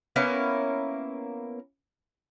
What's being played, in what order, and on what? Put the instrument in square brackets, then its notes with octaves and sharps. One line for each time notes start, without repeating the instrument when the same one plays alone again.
[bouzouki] A#3 B3 C#4 E4